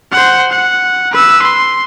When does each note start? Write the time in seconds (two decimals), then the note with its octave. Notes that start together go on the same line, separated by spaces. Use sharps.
0.12 C5 F#5
0.52 F#5
1.12 B4 E6
1.42 C6